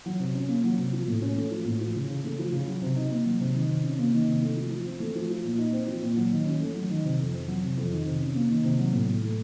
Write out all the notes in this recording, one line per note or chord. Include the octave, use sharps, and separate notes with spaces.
F#3
C3
C#4
A#3
F#3
C3
F3
A2
C#4
A3
F3
A2
F3
C#3
C#3
A3
F3
C#3
F#3
C3
D#4
A#3
F#3
C3
D#3
C3
C#4
A#3
D#3
C3
A3
F3
F3
C4
A3
F3
F3
A#2
D#4
C4
F3
A#2
F#3
D#3
C#4
A3
F#3
D#3
C3
F2
C4
F#3
C3
F2
D#3
C3
C#4
A#3
D#3
C3
F#3
A2
A2
A3